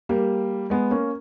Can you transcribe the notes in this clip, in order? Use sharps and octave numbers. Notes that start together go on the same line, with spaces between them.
G3 A#3
G#3 B3
A#3 C#4